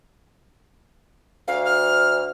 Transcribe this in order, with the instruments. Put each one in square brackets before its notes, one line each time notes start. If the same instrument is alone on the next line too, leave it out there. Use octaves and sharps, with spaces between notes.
[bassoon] D2 [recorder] F5
[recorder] F6